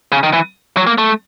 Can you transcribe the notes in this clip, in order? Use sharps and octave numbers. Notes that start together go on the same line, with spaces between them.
C#3
D#3
E3
F#3
A#3
A3